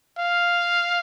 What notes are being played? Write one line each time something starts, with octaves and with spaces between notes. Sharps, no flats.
F5